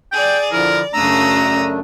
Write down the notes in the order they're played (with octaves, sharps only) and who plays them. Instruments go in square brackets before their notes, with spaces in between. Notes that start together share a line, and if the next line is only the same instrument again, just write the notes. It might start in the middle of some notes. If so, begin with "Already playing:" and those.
[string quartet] G#4 D5 [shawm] G5
[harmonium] D3 F3 E4 [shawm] A#4 [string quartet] D5
[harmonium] F#2 A3 D4 [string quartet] C#3 D#6 E6 [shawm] A#5